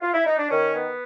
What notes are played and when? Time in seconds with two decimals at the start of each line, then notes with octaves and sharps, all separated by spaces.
0.01 F4
0.13 E4
0.26 D#4
0.38 D4
0.50 D#3 C#4
0.75 B3